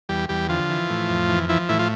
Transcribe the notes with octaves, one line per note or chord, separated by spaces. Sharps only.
E2 G3 G4
E2 G3 G4
D3 F3 F4
E3
A2
F2
E3
E3 F3 E4
A2 E3 E4
F3 F4